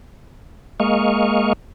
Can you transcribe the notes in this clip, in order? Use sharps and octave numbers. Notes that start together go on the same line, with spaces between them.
G#3 A#3 D#5 F5 C#6